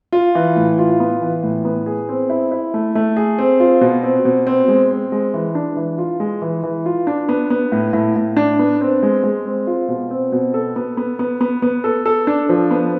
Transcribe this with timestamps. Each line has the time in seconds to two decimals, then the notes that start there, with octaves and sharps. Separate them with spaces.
0.12 F4
0.35 E3
0.56 A2
0.79 F4
1.00 B3
1.22 E3
1.43 A2
1.65 B3
1.86 G#4
2.09 C4
2.30 E4
2.52 E4
2.74 A3
2.95 A3
3.17 G#4
3.39 C4
3.60 F4
3.81 B2
4.03 C4
4.25 B2
4.47 C4
4.68 G#3
4.91 C4
5.12 G#3
5.34 E3
5.55 D4
5.77 E3
5.98 F4
6.20 G#3
6.42 E3
6.63 E3
6.86 F4
7.07 D4
7.29 B3
7.50 B3
7.72 A2
7.93 A2
8.16 A2
8.37 D4
8.59 B3
8.81 C4
9.03 G#3
9.24 G#3
9.46 C4
9.67 F4
9.88 B2
10.11 C4
10.32 B2
10.54 A4
10.76 B3
10.97 B3
11.19 B3
11.41 B3
11.62 B3
11.84 A4
12.06 A4
12.27 D4
12.49 F3
12.71 B3